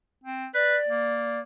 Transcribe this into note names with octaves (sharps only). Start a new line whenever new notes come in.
C4
B4 D5
A#3